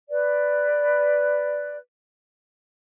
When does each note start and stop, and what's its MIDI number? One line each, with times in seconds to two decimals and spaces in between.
0.09 1.76 71
0.09 1.76 74